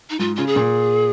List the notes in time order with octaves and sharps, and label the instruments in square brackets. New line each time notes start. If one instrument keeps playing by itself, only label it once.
[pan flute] D#4
[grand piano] G#2 [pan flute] F4
[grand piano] C#3 [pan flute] F4
[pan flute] G#4
[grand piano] A#2